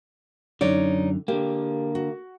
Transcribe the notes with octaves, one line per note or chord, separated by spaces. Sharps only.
F#2 D3 D#4 C#5 D5
D3 A#3 G4
F#4